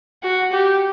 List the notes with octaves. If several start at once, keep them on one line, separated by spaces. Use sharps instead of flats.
F#4
G4